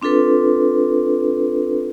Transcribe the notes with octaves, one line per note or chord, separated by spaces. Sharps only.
C4 D4 F4 A4 B4